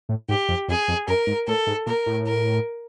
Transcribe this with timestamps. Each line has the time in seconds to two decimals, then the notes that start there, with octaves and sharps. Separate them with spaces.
0.09 A2
0.29 G#2 G4
0.49 F2
0.68 F2 G#4
0.88 F2
1.07 F#2 A#4
1.27 G#2
1.47 A2 A4
1.67 G#2
1.86 A#2 A#4
2.06 A2
2.27 A#4